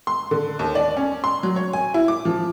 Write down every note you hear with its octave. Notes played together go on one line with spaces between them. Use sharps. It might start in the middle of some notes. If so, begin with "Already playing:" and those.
C6
D3
D#2
D5
C#4
C6
F#3
C#5
G#5
E4
D6
F3